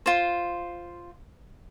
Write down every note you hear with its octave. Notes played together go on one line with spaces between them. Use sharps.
F4 C5